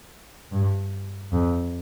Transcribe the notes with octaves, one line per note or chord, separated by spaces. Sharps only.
G2
F2